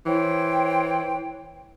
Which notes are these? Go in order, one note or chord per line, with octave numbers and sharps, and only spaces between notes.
E3 C5 C#5 G5